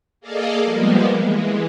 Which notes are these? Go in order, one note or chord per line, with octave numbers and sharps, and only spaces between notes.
A#3 G#4 A4 D5 D#5 F5
F3 G3 G#3 A#3 B3
E3 G#3